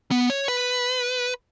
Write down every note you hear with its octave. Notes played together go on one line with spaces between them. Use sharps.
B3
C#5
B4